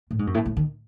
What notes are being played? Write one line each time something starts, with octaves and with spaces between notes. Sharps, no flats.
A2
G#2
F#2
A2
A2
D#3